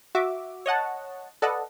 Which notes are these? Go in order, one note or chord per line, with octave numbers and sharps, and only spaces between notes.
F#4 E5 D6
C#5 D#5 F#5 A5
A4 B4 D5 D#5 F#5 A5